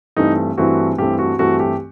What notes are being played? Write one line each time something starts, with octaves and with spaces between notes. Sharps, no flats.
G2 E3 A3 C4 D#4
G2 E3 A3 C4 F#4
G2 E3 A3 C4 G4
F#4
G2 E3 A3 C4 F#4
G4